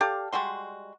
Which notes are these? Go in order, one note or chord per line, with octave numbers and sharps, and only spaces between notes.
G4 A4 D5 F5
G3 G#3 F#4 C6